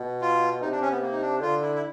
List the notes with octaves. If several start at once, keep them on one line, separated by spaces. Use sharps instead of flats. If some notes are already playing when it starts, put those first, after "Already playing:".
Already playing: B2
F4
C3 D#4
D4
C#4
B3
A#3
D#4
D4
D3 F4
E4
E4